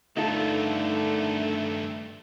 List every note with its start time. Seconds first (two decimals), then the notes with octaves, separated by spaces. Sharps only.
0.17 G2 D3 D#3 A3 D#4 F4 A4